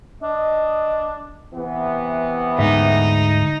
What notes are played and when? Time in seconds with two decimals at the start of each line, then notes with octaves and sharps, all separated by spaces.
0.23 D4 D#5
1.53 C3 E3 B3
2.58 D2 G#2 D#4 E5